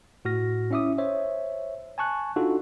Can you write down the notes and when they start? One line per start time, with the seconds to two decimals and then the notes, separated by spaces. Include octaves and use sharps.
0.25 A2 F#4 F6 A#6
0.71 C#4 E4 E5 D6 D#6
0.98 C5 C#5 E5
1.98 G#5 A5 C#6 F#6
2.36 D4 D#4 F4 F#4 A4